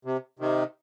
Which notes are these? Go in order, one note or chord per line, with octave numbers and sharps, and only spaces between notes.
C3
C3 D#3